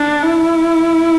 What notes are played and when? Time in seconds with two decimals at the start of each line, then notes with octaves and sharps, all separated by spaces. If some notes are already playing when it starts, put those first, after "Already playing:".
Already playing: D4
0.22 E4